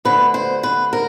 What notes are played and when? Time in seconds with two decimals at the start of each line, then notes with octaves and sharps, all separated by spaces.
0.05 D2 D3 B4
0.34 C5
0.63 B4
0.93 A#4